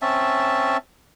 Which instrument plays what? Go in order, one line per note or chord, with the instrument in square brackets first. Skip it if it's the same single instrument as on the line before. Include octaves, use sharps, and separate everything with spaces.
[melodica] C4 C#4 E5 A5